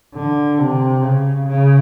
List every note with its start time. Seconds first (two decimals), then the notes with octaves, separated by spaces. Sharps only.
0.14 D3
0.59 C3
1.02 C#3
1.47 C#3